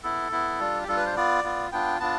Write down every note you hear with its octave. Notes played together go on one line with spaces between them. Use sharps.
B3 E4 A4
B3 E4
G3 D4 F4
G4
G3 D4 F4 A4
B4
C5
B3 F4 D5
B3 F4
B3 D4 F4 G5
B3 D4 F4 A5